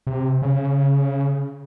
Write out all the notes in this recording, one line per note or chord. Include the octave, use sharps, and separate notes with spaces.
C3
C#3